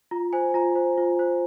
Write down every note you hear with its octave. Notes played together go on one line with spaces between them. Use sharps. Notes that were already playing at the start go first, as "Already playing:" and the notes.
F4 A#5
C5 G#5
F4 A#5
C5
F4
C5